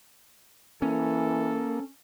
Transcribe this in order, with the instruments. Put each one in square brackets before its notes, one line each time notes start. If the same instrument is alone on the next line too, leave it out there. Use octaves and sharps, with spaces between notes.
[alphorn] E3 [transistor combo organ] A#3 [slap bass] C#4 [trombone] A4